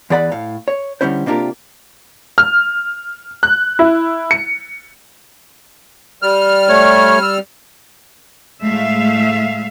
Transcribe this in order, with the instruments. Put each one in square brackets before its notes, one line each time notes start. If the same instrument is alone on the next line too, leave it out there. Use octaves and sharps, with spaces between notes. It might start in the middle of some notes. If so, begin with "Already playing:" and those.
[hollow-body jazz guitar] E2 E3 G#4 D5 F#5 B5
A2 F5
C#5
D3 G3 C#4 E4 C5
C3 A#3 D4 F4 G4 A#4
[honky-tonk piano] F6
F#6
E4
C#7
[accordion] G3 F6
[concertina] A3 C#5
E6
[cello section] A2 G#3 A3 E5 F5